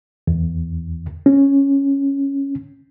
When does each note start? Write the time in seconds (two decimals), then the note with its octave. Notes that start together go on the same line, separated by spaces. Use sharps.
0.27 E2
1.26 C#4